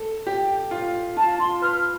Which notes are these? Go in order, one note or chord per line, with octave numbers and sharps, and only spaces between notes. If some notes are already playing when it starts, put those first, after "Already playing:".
Already playing: A4
G4
F4
F4 A5
F4 C6
B4 F6